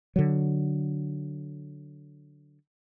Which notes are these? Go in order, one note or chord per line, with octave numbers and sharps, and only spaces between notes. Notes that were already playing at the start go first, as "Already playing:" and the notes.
D3 F#3